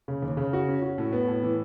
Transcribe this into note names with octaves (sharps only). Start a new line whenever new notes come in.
C#3
D#2
C#3
F#4
C#4
F#4
A2
B3
A2
E3